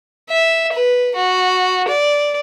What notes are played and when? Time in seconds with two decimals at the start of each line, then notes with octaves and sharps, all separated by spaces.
0.30 E5
0.73 B4
1.16 F#4
1.88 D5